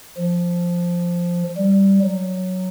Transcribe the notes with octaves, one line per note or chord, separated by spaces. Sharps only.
F3
G3
F#3